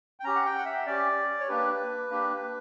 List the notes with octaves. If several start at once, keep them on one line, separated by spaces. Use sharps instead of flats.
G5
C#4 G4 A#5
F#5
G5
F#5
E5
C#4 G4 D5
C#5
A#3 D4 G4 B4
A#3 D4 G4